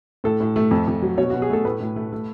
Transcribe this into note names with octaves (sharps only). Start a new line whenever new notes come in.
A2 A4
A2
A3
F2
F2
F#3
B2 C#5
B2 F#4
G#4
A3 A4
A2 B4
A2
A3
A3